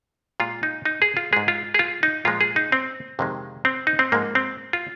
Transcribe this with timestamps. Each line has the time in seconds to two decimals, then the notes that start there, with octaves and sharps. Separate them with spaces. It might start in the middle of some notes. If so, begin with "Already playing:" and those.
0.40 A#2 G#3 F4
0.63 D#4
0.85 D#4
1.02 G#4
1.17 F4
1.33 G#2 G#3 G#4
1.48 F4
1.74 G#4
1.79 F4
2.03 D#4
2.25 A#2 F3 G#3 F4
2.41 G#4
2.56 D#4
2.72 C4
3.19 F2 C3 D#3 G#3
3.65 C4
3.87 D#4
3.99 C4
4.12 G#2 F3 G#3 A#3
4.35 C4
4.73 F4